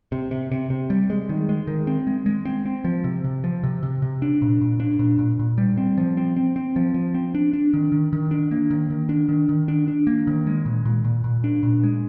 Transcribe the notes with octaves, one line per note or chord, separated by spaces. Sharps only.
C3
C3
C3
C3
G3
G#3
D#3
G#3
D#3
C4
G#3
G#3
C4
C4
F3
C3
C3
F3
C3
C3
C3
D4
A#2
A#2
D4
A#2
A#2
A#2
G3
C4
F3
C4
C4
C4
F3
F3
C4
D4
D4
D#3
D#3
D#3
D4
A#3
D#3
D#3
D4
D#3
D#3
D4
D4
A#3
D#3
G#3
A#2
A#2
A#2
A#2
D4
A#2
G#3